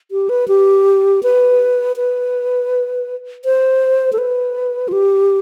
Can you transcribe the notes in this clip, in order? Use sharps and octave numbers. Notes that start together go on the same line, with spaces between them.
G4
B4
G4
B4
B4
C5
A4
B4
F4
G4